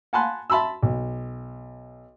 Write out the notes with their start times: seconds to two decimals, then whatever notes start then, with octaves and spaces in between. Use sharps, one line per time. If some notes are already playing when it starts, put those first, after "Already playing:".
0.13 F#5 G#5 A5 B5 C6 F#6
0.50 E5 A5 B5 C6 E6
0.83 B1